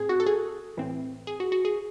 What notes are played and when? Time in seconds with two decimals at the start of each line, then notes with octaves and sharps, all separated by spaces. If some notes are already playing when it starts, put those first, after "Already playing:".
Already playing: A2 C4 G#4
0.09 F#4
0.20 A4
0.27 G#4
0.77 A2 E3 C4
1.27 G#4
1.40 F#4
1.52 F#4
1.65 G#4